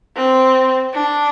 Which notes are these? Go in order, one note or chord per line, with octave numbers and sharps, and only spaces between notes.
C4
D4